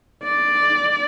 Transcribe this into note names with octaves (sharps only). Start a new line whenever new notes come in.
D5